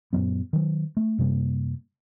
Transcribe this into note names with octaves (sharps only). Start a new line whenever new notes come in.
F#2 A#2 F#3 B3
D#3 F#3
A3
F#2 C3 G3 A#3